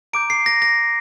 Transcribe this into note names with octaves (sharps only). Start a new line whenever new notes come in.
A#5 D6 G6 D7
C7
A#6
A#6